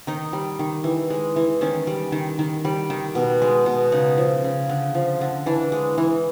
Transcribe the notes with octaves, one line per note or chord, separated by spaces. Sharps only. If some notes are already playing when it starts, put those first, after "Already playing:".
D#3 D#4
G3
D#3
E3
G#3
E3
D#3 C#4
G3
D#3
D#3
G3
D#3
B2
G#3
B2
C#3 D#4
F3
C#3
D3
F3
D3
E3 D4
G#3
E3